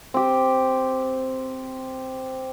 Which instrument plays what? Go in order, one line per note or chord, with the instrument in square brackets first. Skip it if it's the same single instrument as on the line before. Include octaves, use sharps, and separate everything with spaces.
[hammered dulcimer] C4 G4